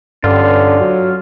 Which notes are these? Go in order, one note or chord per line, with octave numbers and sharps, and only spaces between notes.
G2 D3 C#4 F4
F#3